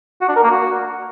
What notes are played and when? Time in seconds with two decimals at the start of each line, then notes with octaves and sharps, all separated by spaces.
0.21 F#4
0.29 D4
0.36 A#4
0.43 A#3
0.51 F#4